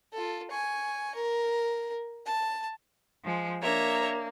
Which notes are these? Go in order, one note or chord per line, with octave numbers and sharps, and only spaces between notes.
F4 A4
G#5 C#6
A#4
A5
F3 G#3
A#3 D4 C#5 E5 A#5